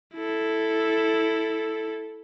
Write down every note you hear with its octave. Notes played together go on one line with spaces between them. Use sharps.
E4 A4